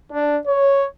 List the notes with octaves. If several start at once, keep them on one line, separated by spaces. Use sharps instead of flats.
D4
C#5